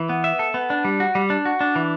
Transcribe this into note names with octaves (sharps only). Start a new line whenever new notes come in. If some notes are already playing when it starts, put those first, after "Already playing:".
Already playing: E3
B3
E5
A4
B3
D4
G3
F#4
G3
D4
F#4
D4
E3